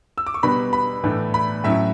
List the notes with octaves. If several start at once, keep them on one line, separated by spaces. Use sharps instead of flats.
E6
D6
C#6
B2 G3 B3 D4 B5
B5
A2 E3 A3 D4
B5
A2 F#3 C#4 E4 E5